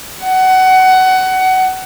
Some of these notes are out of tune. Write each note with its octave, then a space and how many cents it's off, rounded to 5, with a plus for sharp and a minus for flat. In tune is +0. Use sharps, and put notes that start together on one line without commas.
F#5 +20